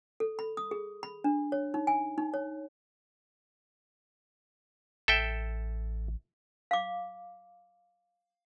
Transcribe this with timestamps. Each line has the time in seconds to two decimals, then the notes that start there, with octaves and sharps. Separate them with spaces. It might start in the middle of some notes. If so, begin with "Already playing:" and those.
0.20 A4
0.39 B5
0.57 D#6
0.71 G#4
1.03 B5
1.24 D4
1.52 C#5
1.74 D#4
1.87 G#5
2.18 D#4
2.34 C#5
5.08 A1 A4 E5 G5
6.71 F5 D6